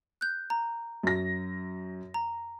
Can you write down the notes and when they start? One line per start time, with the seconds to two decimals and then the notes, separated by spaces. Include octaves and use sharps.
0.21 F#6 G6
0.50 A#5
1.03 F#2 A#6
2.14 A#5